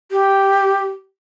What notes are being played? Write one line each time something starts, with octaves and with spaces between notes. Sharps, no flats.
G4